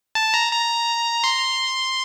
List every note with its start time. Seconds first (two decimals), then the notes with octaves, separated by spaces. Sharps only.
0.15 A5
0.34 A#5
0.52 A#5
1.24 C6